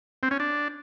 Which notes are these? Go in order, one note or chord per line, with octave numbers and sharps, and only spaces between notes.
C4
C#4
D4